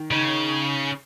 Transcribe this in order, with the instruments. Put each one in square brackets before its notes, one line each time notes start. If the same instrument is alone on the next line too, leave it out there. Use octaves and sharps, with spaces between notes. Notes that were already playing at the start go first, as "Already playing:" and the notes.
Already playing: [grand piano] D#3
[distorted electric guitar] C#3 [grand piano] D#4